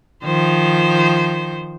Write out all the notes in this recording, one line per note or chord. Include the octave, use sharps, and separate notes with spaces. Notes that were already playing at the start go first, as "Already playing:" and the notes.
D#3 F3 C5